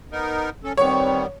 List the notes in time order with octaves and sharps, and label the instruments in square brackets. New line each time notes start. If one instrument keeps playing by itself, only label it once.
[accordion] B3 D#4 A#4
C#4 A4
[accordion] D#3 G3 B3 [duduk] C4 [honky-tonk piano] C#5